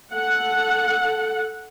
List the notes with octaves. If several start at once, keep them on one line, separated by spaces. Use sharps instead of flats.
A4 F#5